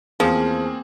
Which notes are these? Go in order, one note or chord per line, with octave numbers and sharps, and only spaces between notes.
E2 F3 A#3 C4 G#4